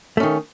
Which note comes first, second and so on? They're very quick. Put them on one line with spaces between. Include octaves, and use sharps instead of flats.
A3 C#4 D#3